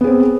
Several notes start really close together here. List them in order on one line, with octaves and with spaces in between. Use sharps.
B3 G#4 C4